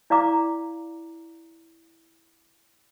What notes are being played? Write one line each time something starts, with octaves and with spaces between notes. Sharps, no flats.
E4 D5 F5 A#5 D6